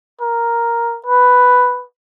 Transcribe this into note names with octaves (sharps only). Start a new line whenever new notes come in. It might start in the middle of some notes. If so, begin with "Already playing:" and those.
A#4
B4